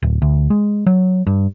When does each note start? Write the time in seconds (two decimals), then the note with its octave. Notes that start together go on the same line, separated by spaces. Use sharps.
0.02 D1
0.22 D2
0.50 G#3
0.86 F#3
1.27 G2